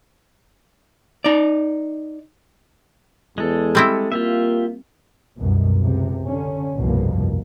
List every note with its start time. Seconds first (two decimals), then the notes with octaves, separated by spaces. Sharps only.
1.24 D#4 D5
3.38 E2 G#3 A4
3.75 G3 C4 E4
4.12 A#3 F4 G4 E5
5.38 C2 F#2 B2
5.80 C#2 C3
6.25 D3 C#4
6.77 G1 C2 F2 B2 A#3